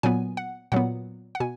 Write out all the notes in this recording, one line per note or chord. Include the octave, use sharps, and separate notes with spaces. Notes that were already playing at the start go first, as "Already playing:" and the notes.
A#2 F#3 B3 G#5
F#5
A#2 F#3 B3 F#5
F#5
B2 G#5